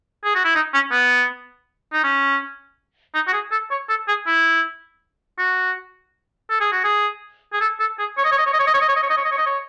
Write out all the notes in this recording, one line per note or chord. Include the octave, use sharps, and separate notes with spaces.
G#4
F#4
E4
D#4
C#4
B3
D#4
C#4
D#4
F#4
G#4
A4
C#5
A4
G#4
E4
F#4
A4
G#4
F#4
G#4
G#4
A4
A4
G#4
C#5
D#5
C#5
D#5
C#5
D#5
C#5
D#5
C#5
D#5
C#5
D#5
C#5
D#5
C#5
D#5
C#5
D#5
C#5